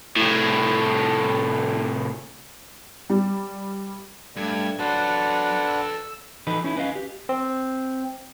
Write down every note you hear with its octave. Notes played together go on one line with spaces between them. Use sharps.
C2 A2
G3
G2 A3 D4 G#6
F#3 D4 A4 B4 C5 F#5
E6
E3 D#4 A4 B4 D#5 B5
C#4 D#4 E4
C#4 B4 D#5 F5
G4
C4